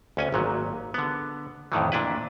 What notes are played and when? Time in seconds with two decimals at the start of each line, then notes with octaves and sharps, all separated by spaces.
0.17 D2 C#4 G#5
0.32 G#1 A#2 F#3
0.94 D3 B3
1.72 F2 A2 D#3 E3
1.92 A#2 D4 E4 B4